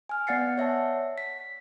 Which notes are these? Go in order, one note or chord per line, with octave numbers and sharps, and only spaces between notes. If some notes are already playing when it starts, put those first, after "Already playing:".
G#5 F6
B3 D5 F#5 A6 C7 C#7
C#5 E5 F#5 A5
B6